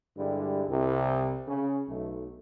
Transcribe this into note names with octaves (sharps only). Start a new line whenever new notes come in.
G2 D3 G3 G#3 D4 E4
C2 C3
C#3
B1 A3